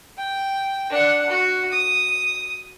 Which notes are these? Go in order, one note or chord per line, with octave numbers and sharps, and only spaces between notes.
G5
D4 F#5
F#4
D#6